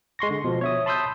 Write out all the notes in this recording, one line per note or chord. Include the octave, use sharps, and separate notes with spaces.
G#3 C6 C#6 A#6
D3
B2 F3
C#5 E5 D#6
A5 B5 C6 D#6 E6 G6